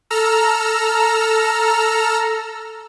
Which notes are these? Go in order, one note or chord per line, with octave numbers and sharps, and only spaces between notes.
A4 A#5 E6 F6